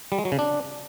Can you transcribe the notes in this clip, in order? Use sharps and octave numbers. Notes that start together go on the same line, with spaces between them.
G3
G#3
F#3
C#3
D4